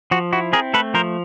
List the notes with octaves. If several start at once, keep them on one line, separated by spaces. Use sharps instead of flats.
F3 F#4
E4 F#4
C4 G#4 A#4
A3 A4 B4
F3 A#4 C5